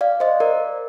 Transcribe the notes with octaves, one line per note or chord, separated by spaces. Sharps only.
D5 F5
C5 D#5
A#4 D5